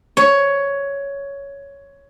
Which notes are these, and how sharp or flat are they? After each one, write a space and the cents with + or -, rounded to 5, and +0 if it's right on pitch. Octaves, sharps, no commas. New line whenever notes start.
C#5 +10